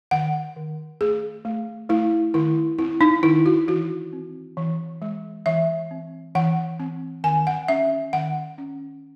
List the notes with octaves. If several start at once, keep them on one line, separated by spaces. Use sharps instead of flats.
D#3 F#5
D#3
A3 G#4
A3
A3 E4
D#3 E4
C4 E4
D#4
D#3 E4
F#4
E3 F#4
C4
E3
G#3
E3 E5
C4
E3 F#5
C4
D#3 G#5
F#5
C#4 E5
D#3 F#5
C#4